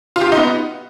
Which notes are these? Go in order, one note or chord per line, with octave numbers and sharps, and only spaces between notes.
F4
G4
F4
D#4
B3